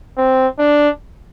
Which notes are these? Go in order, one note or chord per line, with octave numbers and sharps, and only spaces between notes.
C4
D4